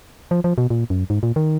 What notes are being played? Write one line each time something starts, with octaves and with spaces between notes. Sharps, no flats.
F3
F3
B2
A#2
F#2
G#2
A#2
D#3